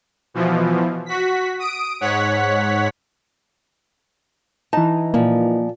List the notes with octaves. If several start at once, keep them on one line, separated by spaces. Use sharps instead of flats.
B2 E3 F3
F#4 B6
D#6 D7
G#2 C#5 F#5 B6
E3 D#4 A5
A#2 F3 A#3